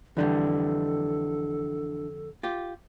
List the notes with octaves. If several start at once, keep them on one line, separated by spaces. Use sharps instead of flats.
F2 D3 E3 G3 D4 A4
F4 G4